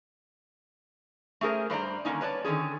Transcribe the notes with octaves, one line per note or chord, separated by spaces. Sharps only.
A3 C#4 G#4 A#4 C5
G2 C5 D5 A#5
D3 D#3 F3 A#3 C#4 D#4
B4 C#5 D5 A5
D3 D#3 G3 C#4 G#4